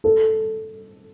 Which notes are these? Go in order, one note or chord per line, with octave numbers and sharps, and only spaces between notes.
A4